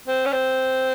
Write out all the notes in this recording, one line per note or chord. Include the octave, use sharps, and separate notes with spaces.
C4
C#4
C4